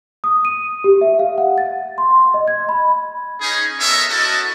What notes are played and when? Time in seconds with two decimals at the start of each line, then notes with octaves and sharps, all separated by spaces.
0.24 D#6
0.45 D#7
0.84 G4
1.01 E5
1.19 F5
1.38 F#5
1.58 A6
1.98 C6
2.34 D#5
2.48 G#6
2.69 B5
3.41 C#4 D#4 G#4
3.80 B3 A4 A#4 C#5 D#5 E5
4.09 C#4 E4 F#4 A4 D#5 A5